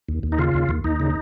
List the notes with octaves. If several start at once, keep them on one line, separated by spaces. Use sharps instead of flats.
D#2
D#2
D#4
C#3 F4
D#2
D#2
D#2 D#4
C#3